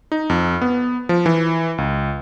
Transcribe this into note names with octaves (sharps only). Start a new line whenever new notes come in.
D#4
F2
B3
F3
E3
C#2